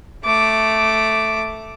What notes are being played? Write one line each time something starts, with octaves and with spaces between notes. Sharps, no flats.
A3 D6